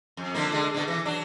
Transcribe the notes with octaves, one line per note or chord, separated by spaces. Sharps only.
F2
D3 F3 A#3
D3 G#3
B2 D3
E3
F#3 D4